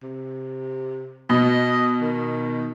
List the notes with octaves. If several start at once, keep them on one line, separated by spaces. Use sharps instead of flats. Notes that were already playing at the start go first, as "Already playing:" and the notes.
C3
B2 D#5
D#3